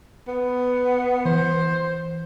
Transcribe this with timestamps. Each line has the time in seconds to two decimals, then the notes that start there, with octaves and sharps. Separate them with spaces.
0.28 B3
1.25 E3 C5